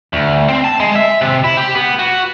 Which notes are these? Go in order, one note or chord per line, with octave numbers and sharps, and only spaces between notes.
D2
C4
A5
G#3
E5
C3
E4
G4
B3
F#4